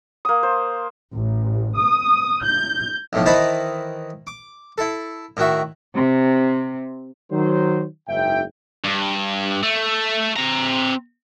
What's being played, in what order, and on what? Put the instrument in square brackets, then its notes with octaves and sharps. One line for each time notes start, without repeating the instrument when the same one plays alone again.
[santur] A#3 D#6
C5
[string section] A1
D#6
G6
[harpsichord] B1 A2 F3
D#3 E3 C5 D#5 A5 B5
D6
E4 A4
A2 D#3 F#4 E5
[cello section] C3
[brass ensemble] D#3 F#3 C5
F#1 G#2 E5 G5
[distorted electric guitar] G2
A3
C4 A#5